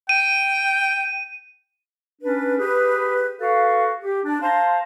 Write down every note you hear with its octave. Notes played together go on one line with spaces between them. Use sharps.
G5 D#7
C#4 D4 B4
G4 G#4 B4
F#4 A4 B4 F5
G4
D4
C5 F5 A5 A#5 C6